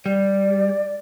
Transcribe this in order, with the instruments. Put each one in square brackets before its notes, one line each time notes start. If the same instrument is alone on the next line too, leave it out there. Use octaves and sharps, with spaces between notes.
[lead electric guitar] G3 [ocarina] D5